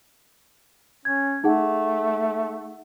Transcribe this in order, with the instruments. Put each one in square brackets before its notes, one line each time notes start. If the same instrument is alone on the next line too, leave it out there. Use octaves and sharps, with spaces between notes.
[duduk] C#4 [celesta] G#6
[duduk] A3 [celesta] D#4 G#4 F#5